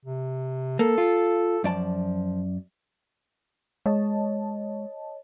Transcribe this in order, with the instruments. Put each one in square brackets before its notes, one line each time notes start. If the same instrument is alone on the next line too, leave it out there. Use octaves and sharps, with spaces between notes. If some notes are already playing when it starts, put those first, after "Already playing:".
[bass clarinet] C3
[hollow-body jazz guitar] A#3 [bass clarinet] A4
[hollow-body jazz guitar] F4
[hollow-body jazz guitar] F#2 D5 A5 [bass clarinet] F3
[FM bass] G#3 [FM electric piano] C#5 D#5 A5